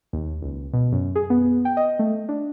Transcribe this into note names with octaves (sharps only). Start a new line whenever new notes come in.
D#2
C#2
B2
F#2
G#4
B3
G5
D#5
A3
D4